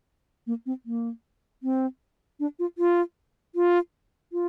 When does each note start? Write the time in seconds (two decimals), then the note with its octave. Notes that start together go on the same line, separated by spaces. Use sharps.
0.47 A#3
0.66 C4
0.86 A#3
1.63 C4
2.40 D4
2.59 F4
2.78 F4
3.55 F4
4.33 F4